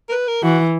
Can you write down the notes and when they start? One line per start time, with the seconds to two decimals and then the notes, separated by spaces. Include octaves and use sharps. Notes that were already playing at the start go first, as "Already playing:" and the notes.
0.09 A#4
0.12 B4
0.28 A#4
0.43 E3 F#4